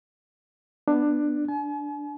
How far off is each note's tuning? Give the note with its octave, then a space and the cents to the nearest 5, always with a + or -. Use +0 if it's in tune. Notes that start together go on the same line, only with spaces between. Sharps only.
B3 +0 D4 +15
D4 +0 G#5 +45